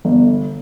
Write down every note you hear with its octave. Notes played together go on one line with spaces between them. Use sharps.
G1